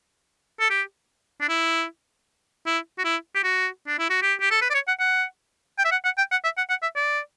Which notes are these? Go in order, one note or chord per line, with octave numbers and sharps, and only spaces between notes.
A4
G4
D4
E4
E4
F#4
E4
G4
F#4
D4
E4
F#4
G4
G4
A4
B4
D5
C#5
F#5
F#5
G5
E5
F#5
F#5
G5
F#5
E5
F#5
F#5
E5
D5